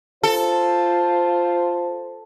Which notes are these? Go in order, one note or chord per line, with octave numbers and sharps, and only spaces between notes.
F4 A4 C5